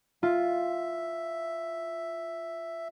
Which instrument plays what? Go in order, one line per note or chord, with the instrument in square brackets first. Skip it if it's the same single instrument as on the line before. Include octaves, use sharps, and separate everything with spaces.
[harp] F4 [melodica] E5